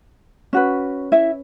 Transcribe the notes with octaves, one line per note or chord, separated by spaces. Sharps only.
C#4 F#4 B4
E4 E5